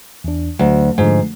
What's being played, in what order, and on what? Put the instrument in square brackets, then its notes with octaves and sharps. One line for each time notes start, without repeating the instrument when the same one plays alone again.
[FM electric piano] E2 D4
[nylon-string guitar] D2 [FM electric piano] F#3
[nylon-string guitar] G#2 [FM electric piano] D3 F3 G#3